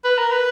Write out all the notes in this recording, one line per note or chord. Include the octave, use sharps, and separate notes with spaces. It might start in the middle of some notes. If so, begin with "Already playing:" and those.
B4
A#4
B4